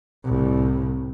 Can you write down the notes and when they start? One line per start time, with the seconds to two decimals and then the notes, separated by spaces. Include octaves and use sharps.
0.25 C2 A2